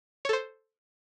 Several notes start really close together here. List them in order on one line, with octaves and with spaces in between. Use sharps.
C#5 A4 C5